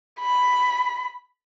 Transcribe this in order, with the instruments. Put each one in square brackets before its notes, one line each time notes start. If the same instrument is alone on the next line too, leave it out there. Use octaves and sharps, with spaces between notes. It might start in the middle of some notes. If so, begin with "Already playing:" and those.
[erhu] B5